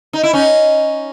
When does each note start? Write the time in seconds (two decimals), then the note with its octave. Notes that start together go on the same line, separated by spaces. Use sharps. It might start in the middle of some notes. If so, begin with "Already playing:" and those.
0.13 D#4
0.23 E4
0.33 C#4 D#4